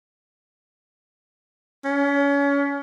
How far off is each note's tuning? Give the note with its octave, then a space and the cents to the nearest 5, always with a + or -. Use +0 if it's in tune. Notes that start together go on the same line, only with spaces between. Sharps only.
C#4 +30